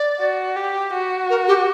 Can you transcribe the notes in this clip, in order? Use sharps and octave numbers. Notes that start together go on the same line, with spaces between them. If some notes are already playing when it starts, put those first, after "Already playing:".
Already playing: D5
F#4
G4
F#4
A#4
G4